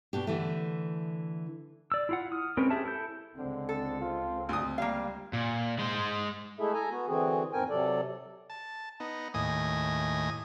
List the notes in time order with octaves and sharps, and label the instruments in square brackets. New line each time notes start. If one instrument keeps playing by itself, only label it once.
[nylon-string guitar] B2 D4 G4
D3 E3 A3
[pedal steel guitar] D5 E6
E4 F4 F#5
D#6 F6
G#3 C4 C#4 A#4 B4
G4 G#4 E5 A5
E4 A4 G6
[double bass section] C#2 G#3 C4 [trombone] D3
[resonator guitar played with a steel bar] A4
[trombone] F4
[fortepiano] D2 D#6
[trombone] G3 [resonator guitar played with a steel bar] A#3 F5
[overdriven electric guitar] A#2
G#3 C5
[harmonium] G#3 A3 E4 G#4 A4 E5
A4 G#5 A#5
B3 F#4
D3 E3 C4 F#4 G#4
E2 G#2 C4 A#4 G5 G#5
C3 F#3 A4 D5
[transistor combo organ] A5
B3 D#4
D#2 A2 D#5 G#5 D#6